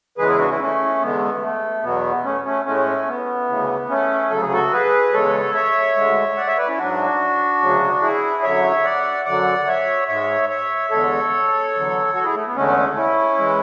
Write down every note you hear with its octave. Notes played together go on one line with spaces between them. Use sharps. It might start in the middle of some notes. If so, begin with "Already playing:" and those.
E2 C#3 E3 G#3 G#4 B4
E4 G#4
D4 F#4
C#4 E4
A3 C#4
E2 D3 G#3 B3
A3
E2 B2 F#3 B3
A3 C#4
A3 C#4
A2 G#3 A3 C#4
B3
D2 C#3 E3
A3 C#4
D2 C#3 F#3 A4
G#4
F#4 A4
G#4 B4
E2 C#3 G#3 A4 C#5
C#5 E5
D2 D3 G#3
D5 F#5
C#5 E5
B4 D5
C#4 E4
G#2 F#3 D4 F#4
D2 C#3 F#3
E4 G#4
F#2 D3 F#3 C#5 E5
D5 F#5
F#2 D3 F#3 D5 F#5
C#5 E5
G#2 G#3 C#5 E5
C#5 E5
E2 D3 G#3 A4 C#5
E2 D3 F#3
F#4 A4
E4 G#4
A3
B3
E2 D3 G#3 A3 C#4
C#4 E4
E3 G#3